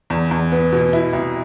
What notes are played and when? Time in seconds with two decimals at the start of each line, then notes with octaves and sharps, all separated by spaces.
0.10 E2
0.31 E2
0.52 B3
0.72 B2
0.93 E4
1.13 C2